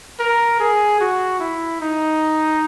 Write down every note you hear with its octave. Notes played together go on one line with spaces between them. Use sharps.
A#4
G#4
F#4
E4
D#4